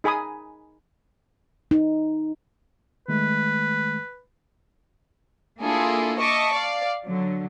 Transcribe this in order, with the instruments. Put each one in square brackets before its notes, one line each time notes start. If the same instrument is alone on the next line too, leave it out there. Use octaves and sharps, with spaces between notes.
[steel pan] D#4 G#4 G#5 B5 D#6
[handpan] D#4
[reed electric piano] D#3 G#3 A3 [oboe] B4
[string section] A#3 D4 E4 F4 G#4 A4
D#5 E5 A5 C#6 D6
D5 F5
D3 F#3